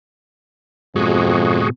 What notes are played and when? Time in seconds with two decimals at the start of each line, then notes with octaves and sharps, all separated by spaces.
0.96 F2 G#2 B2 F#4 G#4